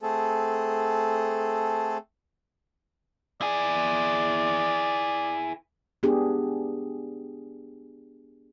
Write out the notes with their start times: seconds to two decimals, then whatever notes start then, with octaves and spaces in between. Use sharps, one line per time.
0.02 A3 C4 G#4 A4
3.41 E4 G#4 D5
6.03 B3 D4 G4 G#4